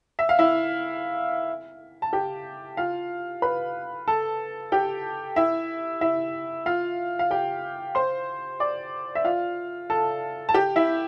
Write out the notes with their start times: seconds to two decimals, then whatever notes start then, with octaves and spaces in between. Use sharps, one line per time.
0.19 E5
0.29 F5
0.39 E4 E5
2.02 A5
2.13 G4 G5
2.77 F4 F5
3.42 B4 B5
4.08 A4 A5
4.72 G4 G5
5.36 E4 E5
6.01 E4 E5
6.66 F4 F5
7.19 F5
7.31 G4 G5
7.95 C5 C6
8.60 D5 D6
9.15 E5
9.24 F4 F5
9.90 A4 A5
10.49 A5
10.54 G4 G5
10.76 E4 E5